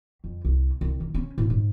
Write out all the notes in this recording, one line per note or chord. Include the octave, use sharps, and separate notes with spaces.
F2
C2
C2
D#3
C#4
A2
G#2